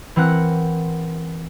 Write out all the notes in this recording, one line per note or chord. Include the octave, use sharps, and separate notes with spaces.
E3 C4 A#4 F#5 F#6